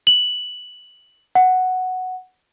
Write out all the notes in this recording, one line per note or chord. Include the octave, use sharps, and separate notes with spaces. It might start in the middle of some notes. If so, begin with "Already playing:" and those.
F#7
F#5